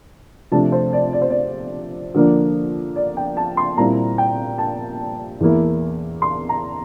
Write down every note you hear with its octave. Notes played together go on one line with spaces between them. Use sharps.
C3 F3 A3 D4 A5
C5
D5
D5
C5
D5
D3 F3 A#3 D4
D5
G5
A5
C6
A#2 G3 C4 E4 A#5
G5
A5
E2 E3 A#3 E4
C6
A#5